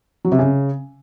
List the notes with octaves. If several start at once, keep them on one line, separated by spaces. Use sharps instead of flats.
F#3
C3
C#3